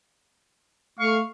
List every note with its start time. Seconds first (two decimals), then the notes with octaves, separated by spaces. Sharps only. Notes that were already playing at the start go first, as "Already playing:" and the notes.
0.99 A3 F5 C#6